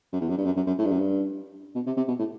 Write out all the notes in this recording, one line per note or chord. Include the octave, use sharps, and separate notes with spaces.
F#2
E2
F#2
G2
F#2
F#2
F#2
A2
G2
F#2
G2
B2
C3
C3
B2
A2